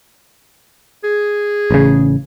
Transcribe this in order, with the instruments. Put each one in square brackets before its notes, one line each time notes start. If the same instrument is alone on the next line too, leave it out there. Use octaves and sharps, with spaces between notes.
[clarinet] G#4
[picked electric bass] A1 C#3